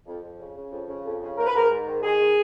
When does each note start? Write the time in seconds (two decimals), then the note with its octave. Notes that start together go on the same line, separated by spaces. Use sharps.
0.06 F2
0.22 F2
0.39 C#3
0.56 C#3
0.71 F2
0.88 C#3
1.05 F2
1.21 C#3
1.37 G#2 A#4
1.47 B4
1.54 G#2 A#4
1.70 G#2
1.86 D#3
2.03 D#3 G#4
2.20 D#3